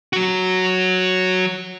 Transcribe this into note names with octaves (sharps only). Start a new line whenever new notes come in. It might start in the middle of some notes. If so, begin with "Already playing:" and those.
F#3 F#4